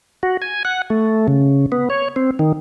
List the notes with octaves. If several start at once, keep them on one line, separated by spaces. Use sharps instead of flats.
F#4
G#5
F#5
A3
C#3
B3
C#5
C4
D#3